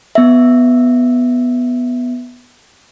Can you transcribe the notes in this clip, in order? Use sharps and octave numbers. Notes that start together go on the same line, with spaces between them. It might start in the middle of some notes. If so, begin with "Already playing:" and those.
B3 E5